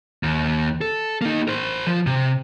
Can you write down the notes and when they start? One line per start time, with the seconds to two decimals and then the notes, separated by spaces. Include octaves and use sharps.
0.23 D#2
0.81 A4
1.22 A#3 D#4
1.48 A#4 C5
1.87 F3
2.07 C3